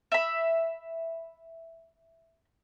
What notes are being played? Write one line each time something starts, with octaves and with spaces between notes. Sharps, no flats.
E5 B5